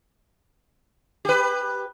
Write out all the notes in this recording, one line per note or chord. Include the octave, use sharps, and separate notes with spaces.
G4 B4